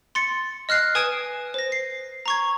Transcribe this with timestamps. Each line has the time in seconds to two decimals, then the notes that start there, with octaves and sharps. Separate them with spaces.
0.15 C6 A6 C#7
0.69 D#5 F6 F#6 C7
0.95 B4 G#5 D#6 G#6 D7 E7
1.54 C5 A#6
1.72 C7
2.26 A#5 C#6 G#6